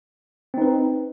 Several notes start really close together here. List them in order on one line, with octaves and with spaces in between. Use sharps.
C4 D#4 B4